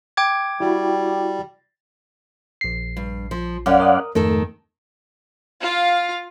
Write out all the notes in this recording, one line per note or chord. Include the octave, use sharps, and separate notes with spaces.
G5 D6 G#6
G3 E4 F#4
A#1 C7
G2
F3
F#2 C#4 D5 F5 F#5
A#4 D#6
F2 G#2 D#3 A3 A4
F4 F5